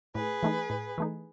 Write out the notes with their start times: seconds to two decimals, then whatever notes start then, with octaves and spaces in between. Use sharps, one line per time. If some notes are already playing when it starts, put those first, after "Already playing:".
0.15 A2 G#4 B4
0.43 E3 A3 D#4
0.70 A2
0.98 E3 A3 D#4